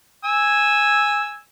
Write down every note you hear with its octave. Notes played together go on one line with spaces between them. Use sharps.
G#5 E6